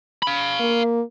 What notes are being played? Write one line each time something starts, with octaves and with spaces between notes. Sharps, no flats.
F5 B5
A#3